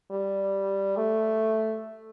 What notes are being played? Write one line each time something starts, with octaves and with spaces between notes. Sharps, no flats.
G3
A3